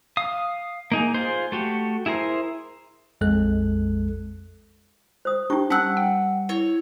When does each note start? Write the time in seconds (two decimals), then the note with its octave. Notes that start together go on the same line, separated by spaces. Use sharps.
0.17 F5 D#6
0.92 A#3 D#4 G#4
1.14 F4 G#4 C5
1.52 A3 F#4 G4
2.06 E4 G#4 A#4 C5
3.21 A#1 F2 G#3 A4 F#6
5.25 C5 D#6
5.50 D4 D#4 G4 G5 C#6
5.70 G3 C#4 F#5 A5 E6 F#6
5.97 G5
6.49 E4 C#5